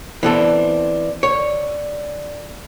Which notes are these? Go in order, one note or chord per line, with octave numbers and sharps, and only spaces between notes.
E3 B3 C4 D4 A4
D3 C#5